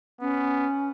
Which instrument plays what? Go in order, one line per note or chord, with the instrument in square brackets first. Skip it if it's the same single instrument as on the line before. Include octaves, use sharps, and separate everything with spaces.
[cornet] B3 [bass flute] C#4